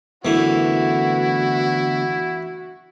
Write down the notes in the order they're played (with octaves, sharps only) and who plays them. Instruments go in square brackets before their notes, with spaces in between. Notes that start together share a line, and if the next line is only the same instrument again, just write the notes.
[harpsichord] F#2 E3 [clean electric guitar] D3 A3 B3 [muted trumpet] E4 [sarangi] F#4